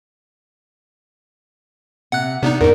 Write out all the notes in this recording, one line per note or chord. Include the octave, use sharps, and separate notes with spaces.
C3 F#5 F#6
C3 B3 D4 D#4
E2 G#2 A#4